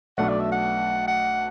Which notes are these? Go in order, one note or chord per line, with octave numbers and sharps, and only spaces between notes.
B1 B2 A3 D4 F#5
D5
E5
F#5
F#5